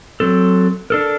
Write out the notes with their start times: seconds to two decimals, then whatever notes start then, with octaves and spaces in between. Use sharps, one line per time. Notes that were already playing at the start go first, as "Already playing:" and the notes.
0.20 F#3 C4 A4
0.90 D4 A4 A#4